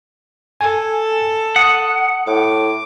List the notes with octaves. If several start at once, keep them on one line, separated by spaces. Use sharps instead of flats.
A4 G#5
F#5 D#6
A2 D6